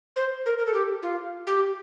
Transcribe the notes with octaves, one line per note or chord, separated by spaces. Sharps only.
C5
A#4
A#4
A4
G4
F4
G4